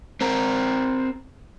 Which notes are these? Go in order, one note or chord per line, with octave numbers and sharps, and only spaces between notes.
C4 A#4